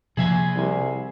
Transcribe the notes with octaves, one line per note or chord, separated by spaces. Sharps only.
C3 F3 A#3 G#4 E5 G#5
C2